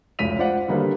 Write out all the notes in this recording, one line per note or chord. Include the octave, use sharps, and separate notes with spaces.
F1 C#2 C#5 B6 D#7 F7
F4 C5 D5 F#5
D3 D#3 G3 A#3 D#4 B4